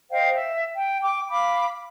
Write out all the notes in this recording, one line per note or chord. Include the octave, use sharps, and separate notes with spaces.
C5 D#5 F5 G5
E5
G5
G5 D6
F5 B5 D6